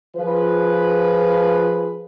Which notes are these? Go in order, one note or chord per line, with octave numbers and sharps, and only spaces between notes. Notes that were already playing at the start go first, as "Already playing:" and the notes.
F3 F4 G#4 B4